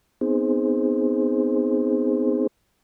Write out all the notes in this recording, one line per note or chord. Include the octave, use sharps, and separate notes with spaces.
B3 C4 D#4 G#4 C5